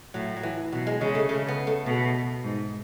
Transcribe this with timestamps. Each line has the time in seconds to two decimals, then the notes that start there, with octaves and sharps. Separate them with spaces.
0.14 A2 F#3
0.36 F#3
0.43 E3
0.72 B2 F#3
0.87 G#3
1.01 C#3 G#3
1.15 A3
1.29 C#3 A3
1.48 B3
1.67 A3
1.86 B2 A3
2.44 G#2